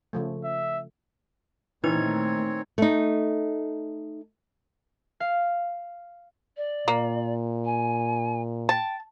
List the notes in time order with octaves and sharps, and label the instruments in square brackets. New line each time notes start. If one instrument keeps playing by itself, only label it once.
[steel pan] C#3 F3 A3
[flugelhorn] E5
[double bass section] A#2 D#3 A3 [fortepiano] E3 [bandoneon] C4 C#5 [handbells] D#4 G#6
[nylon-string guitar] A3 D#4
[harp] F5
[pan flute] D5
[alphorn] A#2 [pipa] A#3
[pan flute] G#5
[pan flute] G5 [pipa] A5